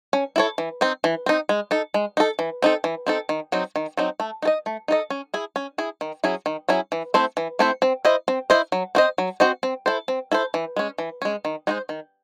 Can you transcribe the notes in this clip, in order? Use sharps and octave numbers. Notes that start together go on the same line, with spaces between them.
C#4
E4 A4 C#5
E3
C4 D#4
E3
C4 D#4
G#3
D#4 A4
G#3
D#4 A4
E3
C4 D#4 A4
E3
C4 D#4 A4
D#3
F#3 C4 D#4
D#3
F#3 C4 D#4
A3
D#4 A4 D#5
A3
D#4 A4 D#5
C#4
E4 G#4
C#4
E4 G#4
D#3
F#3 C#4 E4 G#4
D#3
F#3 C#4 E4 G#4
E3
A3 C4 E4 C5
E3
A3 C4 E4 C5
C4
E4 C5 D#5
C4
E4 C5 D#5
F#3
C4 F#4 C5 D#5
F#3
C4 F#4 C5 D#5
C4
E4 A4 C5
C4
E4 A4 C5
E3
G#3 C#4
E3
G#3 C#4
D#3
G#3 D#4 F#4 C5
D#3